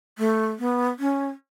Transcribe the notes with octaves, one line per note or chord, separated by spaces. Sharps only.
A3
B3
C#4